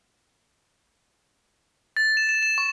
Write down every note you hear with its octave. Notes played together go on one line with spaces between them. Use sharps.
A6
E7
E7
E7
C#6